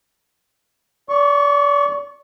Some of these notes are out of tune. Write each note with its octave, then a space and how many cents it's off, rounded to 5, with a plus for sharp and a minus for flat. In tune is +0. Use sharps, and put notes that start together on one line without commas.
D5 -35 C#6 +0